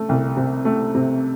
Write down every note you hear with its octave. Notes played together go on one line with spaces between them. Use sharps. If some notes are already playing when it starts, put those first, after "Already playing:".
Already playing: A3
C2
C3
A3
C3